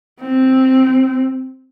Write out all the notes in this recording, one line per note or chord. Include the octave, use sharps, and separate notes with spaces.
C4